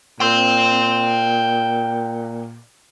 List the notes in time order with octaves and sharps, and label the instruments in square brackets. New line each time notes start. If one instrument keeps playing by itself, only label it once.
[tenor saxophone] A#2 [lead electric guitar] G5 C6